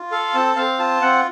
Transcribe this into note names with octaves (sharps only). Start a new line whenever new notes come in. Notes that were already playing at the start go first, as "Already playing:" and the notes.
Already playing: F4
A4 F5
C4 A5
C4 F5
F4 A5
C4 F#5